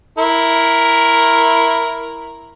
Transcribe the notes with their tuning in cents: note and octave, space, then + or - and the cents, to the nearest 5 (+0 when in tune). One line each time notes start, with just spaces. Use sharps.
E4 +0 A#4 +0 C6 +35